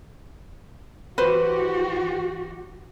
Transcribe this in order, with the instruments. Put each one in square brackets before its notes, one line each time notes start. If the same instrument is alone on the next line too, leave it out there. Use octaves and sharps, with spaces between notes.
[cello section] E3 F#4 G4 [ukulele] B4 C5